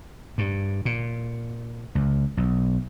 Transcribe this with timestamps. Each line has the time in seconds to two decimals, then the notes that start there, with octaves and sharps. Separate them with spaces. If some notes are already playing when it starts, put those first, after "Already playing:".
0.38 G2
0.85 A#2
1.95 C#2
2.37 B1